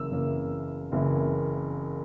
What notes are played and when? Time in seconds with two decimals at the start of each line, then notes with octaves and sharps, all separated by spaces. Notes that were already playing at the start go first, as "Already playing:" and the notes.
Already playing: F#1 F#2 E3 A#3 E6
0.10 F#1 F#2 E3 A#3
0.92 F#1 F#2 E3 A#3